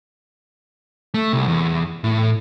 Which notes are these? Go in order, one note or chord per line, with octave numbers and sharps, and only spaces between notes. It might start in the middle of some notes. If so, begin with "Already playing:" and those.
A3
C2
E2
A2